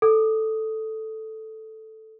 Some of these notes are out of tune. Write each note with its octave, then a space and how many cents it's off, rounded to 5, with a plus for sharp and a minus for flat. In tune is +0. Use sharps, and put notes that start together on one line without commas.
A4 +0 D#6 +5